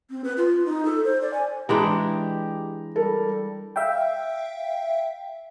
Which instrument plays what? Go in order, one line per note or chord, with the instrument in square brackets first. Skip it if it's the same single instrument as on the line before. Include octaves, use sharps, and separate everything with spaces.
[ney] C4
B4
F4
D#4
A4
C5
D5
G#5
[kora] E3 G#3 D4 [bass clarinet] G4 [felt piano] A#5
[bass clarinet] G3 [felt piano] A4 A#4
[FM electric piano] E5 F5 G5